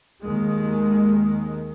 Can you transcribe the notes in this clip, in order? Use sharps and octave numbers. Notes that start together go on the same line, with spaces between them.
D#2 D#3 G#3